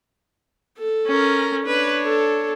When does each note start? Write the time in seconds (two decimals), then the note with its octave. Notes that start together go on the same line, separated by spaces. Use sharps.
0.78 A4
1.07 C#4 A#4
1.66 D4 B4 C#5
2.04 A4